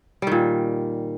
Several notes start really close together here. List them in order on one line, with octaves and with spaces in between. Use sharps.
G3 D#3 A#2